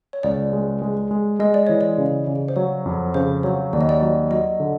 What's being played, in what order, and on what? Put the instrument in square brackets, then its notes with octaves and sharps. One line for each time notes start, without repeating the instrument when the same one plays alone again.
[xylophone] C#5
[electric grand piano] C#2 [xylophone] D5
[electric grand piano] G#3
G#3
G#3
[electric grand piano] G#3 [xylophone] D#5
[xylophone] D5
[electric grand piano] E3 [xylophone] C#5
[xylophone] D5
[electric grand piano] C#3
C#3
[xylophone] C5
[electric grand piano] F#3 [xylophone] C#5
[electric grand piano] F2
[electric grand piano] C#3 [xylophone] C5
[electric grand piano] F#3 [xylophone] C#5
[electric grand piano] D#2 [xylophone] D5
[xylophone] D#5
D5
[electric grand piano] F#3
[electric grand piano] F#3 [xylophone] D#5
[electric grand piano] D3